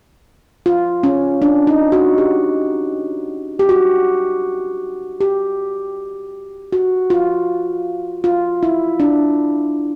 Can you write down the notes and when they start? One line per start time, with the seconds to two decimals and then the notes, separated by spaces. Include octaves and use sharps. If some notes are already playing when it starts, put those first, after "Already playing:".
0.66 F4
1.03 C#4
1.42 D4
1.67 D#4
1.92 F#4
2.18 G4
3.59 G4
3.69 F#4
5.21 G4
6.72 F#4
7.10 F4
8.24 F4
8.63 E4
9.00 D4